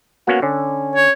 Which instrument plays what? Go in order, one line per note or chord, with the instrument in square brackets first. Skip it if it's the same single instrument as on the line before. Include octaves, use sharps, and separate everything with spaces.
[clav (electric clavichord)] A#3 B3 C#4 [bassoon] F#4
[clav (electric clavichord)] D3 [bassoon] C#4
[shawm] C#5